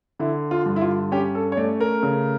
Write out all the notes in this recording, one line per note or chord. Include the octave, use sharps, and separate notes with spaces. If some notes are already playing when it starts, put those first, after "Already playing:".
D3 E4
F4
G2
E4
F4
C#4 G4
A4
C#5
A3 D5
A#4
C#3